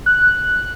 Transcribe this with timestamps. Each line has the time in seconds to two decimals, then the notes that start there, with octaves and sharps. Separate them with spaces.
0.06 F#6